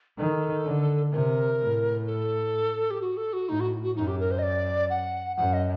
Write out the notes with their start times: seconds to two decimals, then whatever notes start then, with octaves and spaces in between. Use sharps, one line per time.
0.18 D#3 A4
0.64 D3
1.12 C3 A#4
1.60 A2
2.07 A4
2.91 G4
3.01 F#4
3.17 A4
3.33 F#4
3.49 A2 D#4
3.60 F#4
3.83 F#4
3.96 F#2 D#4
4.08 G4
4.20 A#4
4.31 C5
4.39 D#5
4.43 D5
4.90 F#5
5.37 F#2 F#5
5.53 D#5